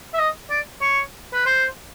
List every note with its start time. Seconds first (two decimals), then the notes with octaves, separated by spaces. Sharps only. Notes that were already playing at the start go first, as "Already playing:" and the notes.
0.14 E5
0.19 D#5
0.50 D5
0.81 C#5
1.33 B4
1.46 C5